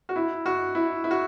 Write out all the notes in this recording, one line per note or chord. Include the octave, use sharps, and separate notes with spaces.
F#4
E4
F#4
E4
E4
F#4